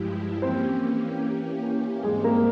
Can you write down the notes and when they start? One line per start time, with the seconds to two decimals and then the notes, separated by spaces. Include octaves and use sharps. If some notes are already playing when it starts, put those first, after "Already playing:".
Already playing: G2 F3 G#3 E4 G4
0.42 E3 A#3 C4 C#4 G4 C5
2.03 G#2 G3 G#3 C4 G4 G#4
2.24 A#3 A#4